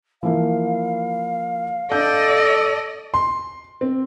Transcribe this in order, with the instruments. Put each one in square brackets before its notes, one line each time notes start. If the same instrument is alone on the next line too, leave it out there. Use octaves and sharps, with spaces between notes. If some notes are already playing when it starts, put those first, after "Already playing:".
[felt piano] E3 F3 A#3 [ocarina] F5
[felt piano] D4 G6 [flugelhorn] A4 [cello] D5 D#5
[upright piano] C6
C4